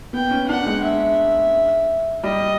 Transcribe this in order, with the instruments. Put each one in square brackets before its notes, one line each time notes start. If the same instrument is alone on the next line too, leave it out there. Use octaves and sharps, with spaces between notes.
[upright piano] B3 [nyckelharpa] G5
[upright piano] C#4
[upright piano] D4 [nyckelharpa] F#5
[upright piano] G#3
[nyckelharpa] E5
[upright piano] G3 [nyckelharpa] D#5